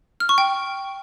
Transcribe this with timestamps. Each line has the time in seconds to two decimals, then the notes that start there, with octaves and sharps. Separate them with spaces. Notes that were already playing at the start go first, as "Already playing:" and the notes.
0.20 F6
0.29 C#6
0.38 G5